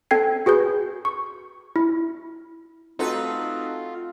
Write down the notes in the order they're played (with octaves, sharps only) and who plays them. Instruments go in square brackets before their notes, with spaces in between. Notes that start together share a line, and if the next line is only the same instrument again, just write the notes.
[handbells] C4 A4 G5 G#6 C7
F#4 G#4 B4 G6
C#6
E4
[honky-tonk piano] A3 F#4 A4 [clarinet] C4 [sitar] D#4 B4 [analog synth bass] F4